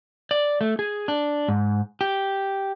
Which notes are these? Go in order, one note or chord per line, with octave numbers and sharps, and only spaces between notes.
D5
A3
G#4
D4
G#2
G4